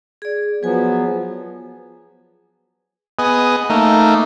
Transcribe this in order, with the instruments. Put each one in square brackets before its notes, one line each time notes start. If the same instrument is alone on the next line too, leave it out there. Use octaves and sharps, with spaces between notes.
[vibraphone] G#4 D5
[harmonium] F3 F#3 B3 [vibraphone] G#4 B4 G#5
[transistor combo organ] B3 G#4 D#5
A3 A#3 D#4